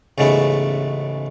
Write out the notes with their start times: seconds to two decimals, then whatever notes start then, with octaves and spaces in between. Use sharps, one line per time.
0.18 A1 G#2 C#3 A3 B3